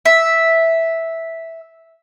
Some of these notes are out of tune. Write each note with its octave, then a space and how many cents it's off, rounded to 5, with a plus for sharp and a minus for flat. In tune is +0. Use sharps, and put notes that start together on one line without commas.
E5 -5